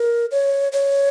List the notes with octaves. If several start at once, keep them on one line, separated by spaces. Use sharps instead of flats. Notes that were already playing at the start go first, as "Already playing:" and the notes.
Already playing: A#4
C#5
C#5